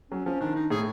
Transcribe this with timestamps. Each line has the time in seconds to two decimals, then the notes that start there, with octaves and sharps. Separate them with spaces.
0.11 F#3 C#4
0.26 F3 C#4
0.40 D#3 D4
0.55 D#4
0.70 A2 G#4